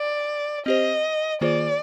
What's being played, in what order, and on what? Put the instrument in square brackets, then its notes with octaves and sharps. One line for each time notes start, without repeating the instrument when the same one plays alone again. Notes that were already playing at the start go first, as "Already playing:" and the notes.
Already playing: [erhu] D5
[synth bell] C4 G4 C5 [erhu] D#5
[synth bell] D#3 A#3 F4 G#4 C5 [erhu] D5